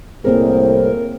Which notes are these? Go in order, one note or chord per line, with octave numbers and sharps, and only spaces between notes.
C2 A2 A#3 C4 G#4 A#4 C5